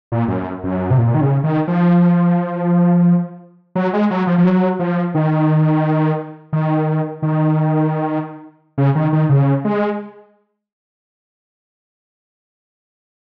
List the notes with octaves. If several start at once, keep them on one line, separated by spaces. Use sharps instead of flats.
A#2
F#2
F#2
C3
A#2
D#3
C#3
D#3
F3
F#3
G#3
F#3
F3
F3
F#3
F3
D#3
D#3
D#3
C#3
D#3
D#3
C#3
G#3